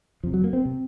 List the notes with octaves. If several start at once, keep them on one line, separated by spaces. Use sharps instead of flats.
F2 C3 F3
F#3
A#3
C4
C3